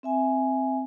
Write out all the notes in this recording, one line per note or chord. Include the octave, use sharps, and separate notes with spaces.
C4 E5 G#5